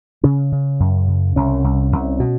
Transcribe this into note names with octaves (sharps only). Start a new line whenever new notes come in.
C#3 C#4
C#3
F#2
C#3
C2 C#4
C2
C2
B2